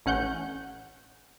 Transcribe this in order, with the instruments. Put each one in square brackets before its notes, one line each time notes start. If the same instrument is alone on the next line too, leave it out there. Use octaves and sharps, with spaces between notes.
[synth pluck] A1 C#4 F#5 G6